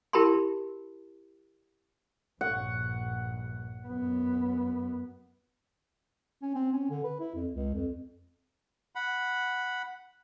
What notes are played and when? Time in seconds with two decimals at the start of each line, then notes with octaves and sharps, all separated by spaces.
0.13 E4 G4 A#4 A5 B5 C6
2.41 A#1 G2 F#5 C#6
3.87 F#2 B3
6.42 C#4
6.55 C4
6.73 C#4
6.90 D3
7.04 B4
7.20 E4
7.35 F2
7.53 C#2
7.74 F2
8.95 F#5 B5